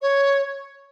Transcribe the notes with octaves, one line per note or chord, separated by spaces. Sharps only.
C#5